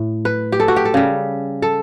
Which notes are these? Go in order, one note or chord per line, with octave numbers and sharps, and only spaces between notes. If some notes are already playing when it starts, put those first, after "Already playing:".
Already playing: A2
B4
G4
A4
F#4
G4
A4
C#3 G3
A4